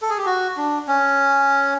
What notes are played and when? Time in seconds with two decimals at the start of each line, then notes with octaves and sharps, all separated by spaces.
0.02 A4
0.10 G#4
0.18 G4
0.26 F#4
0.57 D4
0.88 C#4